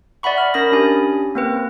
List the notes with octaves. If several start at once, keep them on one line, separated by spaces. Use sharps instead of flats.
D5 E5 F#5 B5 C#6
D5 F6
C#4 A#4 B5 D#6 A#6
C#4 D4 G4 G#5
A#3 C4 B4